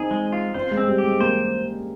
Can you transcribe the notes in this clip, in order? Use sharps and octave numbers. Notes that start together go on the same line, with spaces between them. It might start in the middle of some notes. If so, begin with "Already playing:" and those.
Already playing: C4 D#4 G#4
G#3
F4
C4 C5
G#3
C4
G3
G4
G#3
A#3 C5